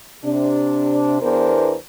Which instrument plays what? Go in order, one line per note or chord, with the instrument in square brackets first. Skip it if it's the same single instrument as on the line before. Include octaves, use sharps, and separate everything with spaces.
[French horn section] C3 D4
E2 E3 B3 D4 A#4 C5